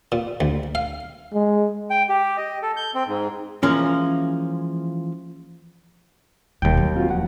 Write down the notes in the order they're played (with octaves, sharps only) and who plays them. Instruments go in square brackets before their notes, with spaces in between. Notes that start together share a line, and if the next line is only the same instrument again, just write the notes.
[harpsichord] A#2
D2
F5
[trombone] G#3
[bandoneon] G5
G4
D#5
A4
G6
C4
G#2
[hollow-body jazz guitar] E3 F3 G#3 A#3 C#4
[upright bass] D#1 [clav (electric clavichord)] D#2 G5 [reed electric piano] B2 D#3 G3
[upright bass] F#3
[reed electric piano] C4 F4 F#4
E2 F3 F#5